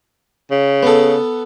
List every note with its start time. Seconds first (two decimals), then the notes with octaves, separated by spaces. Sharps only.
0.51 C#3
0.83 B3 A4